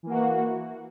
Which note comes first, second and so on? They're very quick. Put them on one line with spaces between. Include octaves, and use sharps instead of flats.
E3 A#3 F#4